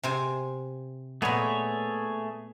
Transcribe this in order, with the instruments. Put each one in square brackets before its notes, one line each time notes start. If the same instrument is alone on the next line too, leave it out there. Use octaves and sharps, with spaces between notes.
[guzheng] C3 C5 G#5
[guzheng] A#2 B3 [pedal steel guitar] A3 G#4 C#5